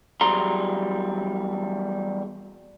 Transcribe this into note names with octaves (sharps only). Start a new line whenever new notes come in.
E2 F#3 G3 G#4 A#5 C6